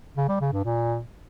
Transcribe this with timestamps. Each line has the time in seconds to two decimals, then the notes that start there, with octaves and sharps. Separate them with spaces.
0.17 C#3
0.29 G3
0.41 C#3
0.53 G2
0.64 A#2